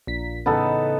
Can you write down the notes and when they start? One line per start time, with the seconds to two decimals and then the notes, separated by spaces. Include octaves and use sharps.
0.07 A#1 B6
0.46 A1 C#3 B3 D#4 A4